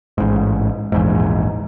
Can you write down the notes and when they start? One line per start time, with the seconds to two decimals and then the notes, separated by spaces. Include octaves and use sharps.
0.18 A1 G#2
0.92 A#1 E2 G#2